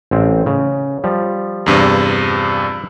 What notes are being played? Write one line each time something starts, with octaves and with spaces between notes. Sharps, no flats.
A1 C4
C#3
F3 G3
E2 G2 C3